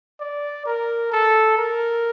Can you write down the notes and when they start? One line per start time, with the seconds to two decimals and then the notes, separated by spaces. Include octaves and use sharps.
0.20 D5
0.66 A#4
1.12 A4
1.58 A#4